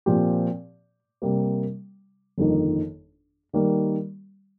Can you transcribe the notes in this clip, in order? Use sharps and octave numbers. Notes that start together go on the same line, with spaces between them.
A#2 F3 C4 G4
C3 G3 A#3
G1 F2 D#3 A#3 D#4
D#3 G3 A#3